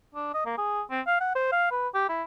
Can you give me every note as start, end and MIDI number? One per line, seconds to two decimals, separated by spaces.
0.15 0.34 62
0.34 0.42 75
0.46 0.54 58
0.58 0.82 68
0.91 1.01 60
1.07 1.16 77
1.20 1.35 78
1.35 1.49 72
1.52 1.69 77
1.71 1.88 71
1.94 2.07 67
2.09 2.23 64